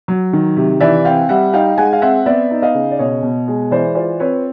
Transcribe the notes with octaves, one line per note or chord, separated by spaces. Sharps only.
F#3
D#3
C3
E3 D5 E5
C4 F5 G5
G3 E5 F#5
D#4 F5 G5
G#3 F#5 G#5
F5
C4 E5 F#5
B3 D5 E5
D#4
D#5 F5
C#3
D5
B2 C#5 D#5
B2
G#3
E3 C5 D5
F4 C5 D5
C4 B4 C#5